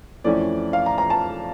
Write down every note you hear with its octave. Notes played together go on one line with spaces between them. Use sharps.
F2 E3 A3 C#4 E4 D5
F5
A#5
A#5
A5